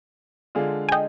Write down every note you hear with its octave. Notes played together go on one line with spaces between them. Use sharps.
D3 G#3 D4 F4 G#4
G#5
D#5 G5